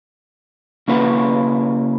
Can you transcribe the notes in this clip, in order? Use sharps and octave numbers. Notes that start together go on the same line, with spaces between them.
C#3 A#3 E4 B4 F#5